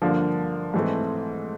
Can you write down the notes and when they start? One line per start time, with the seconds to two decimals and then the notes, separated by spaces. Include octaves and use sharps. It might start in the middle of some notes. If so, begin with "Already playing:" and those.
0.02 G2 D3 F3 A#3 D4
0.74 G#2 E3 A3 C4